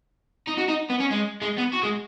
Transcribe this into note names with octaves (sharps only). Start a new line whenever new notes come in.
D#4
F#4
D#4
B3
C#4
G#3
G#3
B3
F#4
G#3